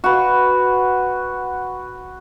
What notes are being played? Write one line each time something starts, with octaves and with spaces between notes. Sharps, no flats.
F#4 B4